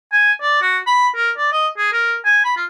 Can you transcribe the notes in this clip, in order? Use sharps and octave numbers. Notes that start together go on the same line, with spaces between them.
G#5
D5
F#4
B5
A#4
D5
D#5
G#4
A#4
G#5
B5
F4